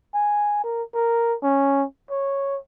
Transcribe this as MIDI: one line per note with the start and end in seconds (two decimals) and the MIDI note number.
0.15 0.63 80
0.64 0.83 70
0.94 1.36 70
1.43 1.85 61
2.10 2.58 73